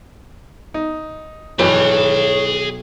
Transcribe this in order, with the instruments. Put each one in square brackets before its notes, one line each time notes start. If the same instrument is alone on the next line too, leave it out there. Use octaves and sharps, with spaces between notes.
[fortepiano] D#4
[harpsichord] B1 [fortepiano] G2 E3 [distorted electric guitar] G#4 B5 [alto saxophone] C#5